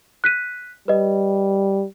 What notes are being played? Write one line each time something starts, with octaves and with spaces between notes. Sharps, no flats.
F#6 B6 D#7
G3 B4 D#5